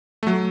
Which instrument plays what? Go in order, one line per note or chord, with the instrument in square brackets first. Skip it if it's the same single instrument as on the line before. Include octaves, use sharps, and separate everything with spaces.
[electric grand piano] A3
F#3